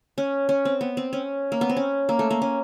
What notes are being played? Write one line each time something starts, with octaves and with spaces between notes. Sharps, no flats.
C#4
C#4
C4
B3
C4
C#4
A#3
B3
C4
C#4
A#3
A3
A#3
C#4